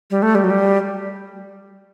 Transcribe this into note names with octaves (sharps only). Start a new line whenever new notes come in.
G3
A3
G3
F#3
G3